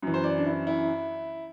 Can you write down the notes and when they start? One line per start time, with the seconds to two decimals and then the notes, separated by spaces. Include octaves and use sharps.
0.02 F#2 E3
0.14 C5
0.24 D5
0.38 D4
0.46 E4
0.67 E4